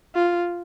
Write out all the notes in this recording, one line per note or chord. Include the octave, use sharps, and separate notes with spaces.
F4